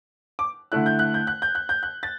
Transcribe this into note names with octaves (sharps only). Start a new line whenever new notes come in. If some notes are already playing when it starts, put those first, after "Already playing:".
D6
D3 A3 E4 F#6
G6
F#6
G6
F#6
G6
F#6
G6
F#6
A6